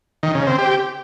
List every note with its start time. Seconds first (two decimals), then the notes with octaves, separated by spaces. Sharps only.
0.23 D#3
0.35 C#3
0.47 C4
0.58 G4